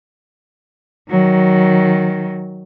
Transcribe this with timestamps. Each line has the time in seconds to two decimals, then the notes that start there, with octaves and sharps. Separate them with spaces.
1.10 D#3 F#3